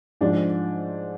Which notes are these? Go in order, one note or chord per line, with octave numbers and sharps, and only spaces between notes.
G#2 F3 D4